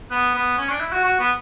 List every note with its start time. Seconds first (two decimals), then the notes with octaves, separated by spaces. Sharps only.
0.11 B3
0.34 B3
0.58 C#4
0.70 D4
0.81 E4
0.92 F#4
1.04 F#4
1.20 B3